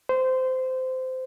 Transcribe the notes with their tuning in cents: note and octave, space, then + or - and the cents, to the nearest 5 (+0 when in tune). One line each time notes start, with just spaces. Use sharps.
C5 -20